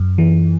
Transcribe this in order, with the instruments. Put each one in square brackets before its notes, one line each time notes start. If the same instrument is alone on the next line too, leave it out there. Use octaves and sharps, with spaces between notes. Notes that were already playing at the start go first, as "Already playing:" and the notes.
Already playing: [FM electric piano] F#2
E3